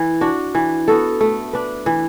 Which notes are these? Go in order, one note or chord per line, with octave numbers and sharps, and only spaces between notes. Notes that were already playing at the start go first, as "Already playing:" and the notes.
Already playing: E3
D4 F#4
E3
B3 F#4 A4
A3
D4 B4
E3